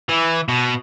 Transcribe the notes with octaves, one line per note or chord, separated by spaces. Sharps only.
E3
B2